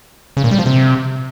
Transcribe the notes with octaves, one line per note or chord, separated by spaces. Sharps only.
C#3
A#2
G3
F3
C3